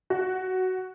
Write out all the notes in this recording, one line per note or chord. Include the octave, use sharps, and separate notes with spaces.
F#4